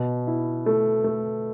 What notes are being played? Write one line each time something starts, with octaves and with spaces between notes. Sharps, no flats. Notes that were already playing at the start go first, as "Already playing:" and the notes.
Already playing: B2
E4
A3
A3